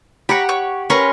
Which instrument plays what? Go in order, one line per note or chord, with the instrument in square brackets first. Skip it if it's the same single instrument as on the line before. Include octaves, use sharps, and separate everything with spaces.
[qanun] G4 F#5 [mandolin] C#5 A#5 B5
[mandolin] C#5
[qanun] C#4 C6 C#6 [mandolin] A#4 B4 A#5